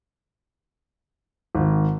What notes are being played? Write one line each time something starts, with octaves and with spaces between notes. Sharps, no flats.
G#1